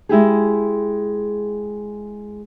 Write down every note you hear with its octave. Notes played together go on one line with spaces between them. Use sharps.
G#3 E4 G4 G#4